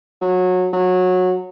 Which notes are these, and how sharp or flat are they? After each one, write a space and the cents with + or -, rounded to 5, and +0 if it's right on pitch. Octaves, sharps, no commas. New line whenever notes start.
F#3 -20
F#3 -20